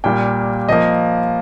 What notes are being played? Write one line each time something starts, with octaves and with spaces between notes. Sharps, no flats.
A#2 G3 A#3 G5
F3 A#3 D#5